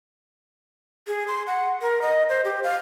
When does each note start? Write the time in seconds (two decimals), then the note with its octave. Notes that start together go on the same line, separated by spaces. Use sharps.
1.07 G#4
1.28 C6
1.47 F#5
1.82 A#4
2.02 D#5
2.29 C5
2.45 G4
2.63 F5